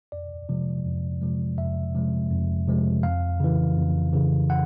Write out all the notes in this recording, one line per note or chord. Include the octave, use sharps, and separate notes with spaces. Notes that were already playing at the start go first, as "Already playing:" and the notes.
F2 D5
C3 F3 G#3
F2
C3 F3 G#3
F2 E5
C3 F3 G#3
F2
C3 F3 G#3
F2 F5
C#3 E3
F2
C#3 E3
F#5